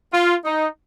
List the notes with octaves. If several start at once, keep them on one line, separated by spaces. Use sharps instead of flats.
F4
D#4